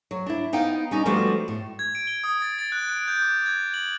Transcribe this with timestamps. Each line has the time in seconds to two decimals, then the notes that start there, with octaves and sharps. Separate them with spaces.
0.11 F#3
0.26 D4 E4
0.53 B3 D#4 F5 G5
0.91 G3 C#4 D#4
1.06 F3 G3 A3 B3 D4 F#4
1.48 A2
1.79 G#6
1.95 D7
2.07 G7
2.24 D#6
2.42 A6
2.59 A6
2.72 F#6
2.90 D7
3.08 G6
3.22 D6
3.46 G#6
3.74 F#7